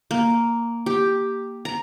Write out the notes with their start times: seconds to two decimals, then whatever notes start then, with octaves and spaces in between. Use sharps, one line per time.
0.11 A#3
0.86 G4
1.65 A#5